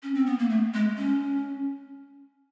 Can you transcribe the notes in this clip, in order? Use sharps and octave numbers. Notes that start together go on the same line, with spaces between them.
C#4
C4
B3
A#3
A3
G#3
C#4